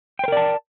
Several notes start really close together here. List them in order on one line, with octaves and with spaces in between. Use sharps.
G5 C5 A#4 D5 A5